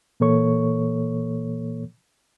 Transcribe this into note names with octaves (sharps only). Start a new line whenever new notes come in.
A#2 E3 A#3 A4 C#5 C#6